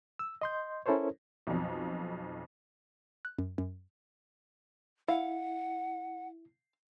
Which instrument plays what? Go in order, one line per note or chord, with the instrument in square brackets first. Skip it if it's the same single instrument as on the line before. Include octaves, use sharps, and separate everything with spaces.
[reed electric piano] E6
D#5 C6 G6
C#4 E4 A4 A#4 C5 C#5
[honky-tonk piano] B1 F2
[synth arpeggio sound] F#6
F#2
F#2
[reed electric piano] E4 [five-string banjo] F5 [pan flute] F#5